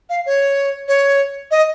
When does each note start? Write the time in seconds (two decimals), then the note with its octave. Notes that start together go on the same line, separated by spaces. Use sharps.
0.10 F5
0.26 C#5
0.88 C#5
1.51 D#5